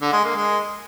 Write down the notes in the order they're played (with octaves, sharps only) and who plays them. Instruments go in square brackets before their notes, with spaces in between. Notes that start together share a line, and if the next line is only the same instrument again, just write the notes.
[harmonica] D3
G#3
A#3
G#3